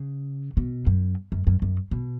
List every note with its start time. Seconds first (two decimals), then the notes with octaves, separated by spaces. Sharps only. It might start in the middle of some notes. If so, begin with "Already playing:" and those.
Already playing: C#3
0.57 B2
0.87 F#2
1.32 F#2
1.47 F#2
1.62 F#2
1.91 B2